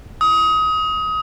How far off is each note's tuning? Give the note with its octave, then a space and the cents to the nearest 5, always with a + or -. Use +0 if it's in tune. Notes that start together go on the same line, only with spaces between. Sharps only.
D#6 +25